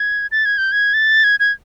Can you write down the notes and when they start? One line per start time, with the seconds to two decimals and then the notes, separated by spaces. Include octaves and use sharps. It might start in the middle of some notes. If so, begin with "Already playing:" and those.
Already playing: G#6
0.32 A6
0.45 G#6
0.58 G6
0.72 G#6
0.94 A6
1.24 G#6
1.40 G#6